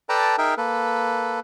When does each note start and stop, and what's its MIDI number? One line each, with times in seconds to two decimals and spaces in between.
0.09 0.36 69
0.09 0.36 71
0.09 0.36 74
0.09 0.36 79
0.09 0.36 81
0.09 0.36 82
0.38 0.55 63
0.38 0.55 68
0.38 0.55 70
0.38 0.55 76
0.38 0.55 79
0.57 1.40 58
0.57 1.40 69
0.57 1.40 71